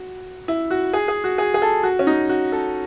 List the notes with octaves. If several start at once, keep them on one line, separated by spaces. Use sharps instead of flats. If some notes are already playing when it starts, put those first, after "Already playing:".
Already playing: F#4
E4
F#4
G#4
G#4
F#4
G#4
G#4
A4
F#4
C#4
D#4
F#4
A4